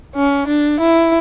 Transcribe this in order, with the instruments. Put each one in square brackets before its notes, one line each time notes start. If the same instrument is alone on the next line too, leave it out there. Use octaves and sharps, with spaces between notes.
[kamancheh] C#4
D4
E4